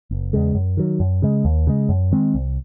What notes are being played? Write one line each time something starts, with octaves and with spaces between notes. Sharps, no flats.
F#1
E2 C#3 G#3
F#2
D#3 F#3
F#2
C#3 G#3
D#2
C#3 G#3
F#2
D#3 G#3 C4
C2